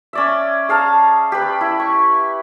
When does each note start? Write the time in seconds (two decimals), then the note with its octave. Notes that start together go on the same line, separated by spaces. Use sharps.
0.13 C#4 D5 E5
0.69 G#4 F5 A5 A#5
1.32 G4 B4
1.61 E4
1.80 C#6